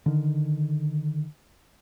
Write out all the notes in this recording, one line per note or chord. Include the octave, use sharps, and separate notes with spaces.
D3 D#3